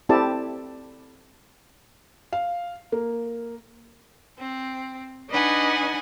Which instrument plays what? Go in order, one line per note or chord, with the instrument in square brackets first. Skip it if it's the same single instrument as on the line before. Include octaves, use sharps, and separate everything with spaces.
[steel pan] C4 E4 G4 A4 D5 A5
[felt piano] F5
A#3
[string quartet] C4
D4 D#4 B4 D#5 F#5 G#5